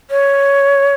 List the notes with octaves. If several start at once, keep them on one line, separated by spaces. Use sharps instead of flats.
C#5